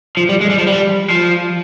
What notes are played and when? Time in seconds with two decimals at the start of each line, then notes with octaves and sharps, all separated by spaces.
0.17 F3
0.29 G3
0.41 G#3
0.50 G3
0.58 F3
0.67 G3
1.11 F3